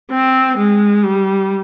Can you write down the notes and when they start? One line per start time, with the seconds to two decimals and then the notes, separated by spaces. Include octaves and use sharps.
0.11 C4
0.58 G#3
1.04 G3